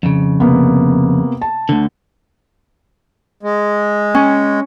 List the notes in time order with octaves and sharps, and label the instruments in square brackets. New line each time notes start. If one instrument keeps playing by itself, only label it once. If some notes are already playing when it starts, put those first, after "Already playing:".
[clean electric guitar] F2 C#3
[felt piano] C3 A#3 B3
A5
[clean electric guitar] D2 D3
[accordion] G#3
[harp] C#4